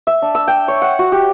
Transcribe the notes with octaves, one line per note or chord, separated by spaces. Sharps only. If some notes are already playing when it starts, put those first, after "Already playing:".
E5
D4
E6
G5
C#5
F#5
F#4
G4